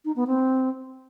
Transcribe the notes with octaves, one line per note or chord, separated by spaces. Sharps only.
D#4
B3
C4